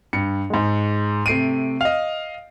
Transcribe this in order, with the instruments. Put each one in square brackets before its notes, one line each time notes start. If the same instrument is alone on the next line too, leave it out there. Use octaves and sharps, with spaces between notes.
[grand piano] G2 C#7
G#2 G#3
C3 A3 C7 D7 D#7
D#5 F5